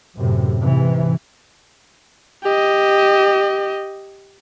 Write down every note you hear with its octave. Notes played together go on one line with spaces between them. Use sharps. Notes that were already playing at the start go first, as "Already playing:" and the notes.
F#2 A2 C3
G#2 C3 E3
G4 D#5